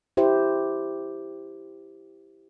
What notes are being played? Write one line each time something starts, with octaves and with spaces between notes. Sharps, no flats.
E4 G4 C5